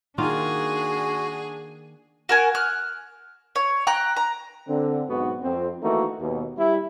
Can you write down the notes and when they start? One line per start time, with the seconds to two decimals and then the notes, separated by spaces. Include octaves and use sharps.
0.18 D#3 A#3 D4 F4 F#4 G#4
2.29 F#4 A#4 G#5
2.55 F6 F#6
3.56 C#5
3.87 G5 A#5 F#6
4.17 A#5
4.68 D3 C4
5.09 B1 G#2 B3 F#4
5.42 F2 C4
5.83 D#3 E3 A3 A#3 D#4 F#4
6.20 D#2 B2
6.58 G3 E4